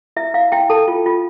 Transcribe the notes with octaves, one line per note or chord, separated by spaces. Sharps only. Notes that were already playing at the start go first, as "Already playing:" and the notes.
E4 E5
E4 F5
E4 G5
A4 A5
F4
F4